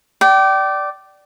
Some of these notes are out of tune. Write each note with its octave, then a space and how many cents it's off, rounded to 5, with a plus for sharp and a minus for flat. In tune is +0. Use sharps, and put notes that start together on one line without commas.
D5 +0 G5 -30